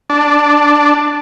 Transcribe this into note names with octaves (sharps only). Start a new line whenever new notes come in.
D4